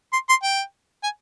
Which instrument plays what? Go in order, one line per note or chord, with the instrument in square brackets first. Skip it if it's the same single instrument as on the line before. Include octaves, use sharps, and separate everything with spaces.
[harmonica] C6
C6
G5
G#5